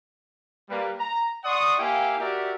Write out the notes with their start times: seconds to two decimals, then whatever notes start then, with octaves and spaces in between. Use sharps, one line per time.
0.69 G3 A#3 B4
0.99 A#5
1.44 D5 F#5 C6 C#6 D#6
1.78 A#3 E4 G4 F5 G5 G#5
2.19 F#4 G4 A#4 D5 E5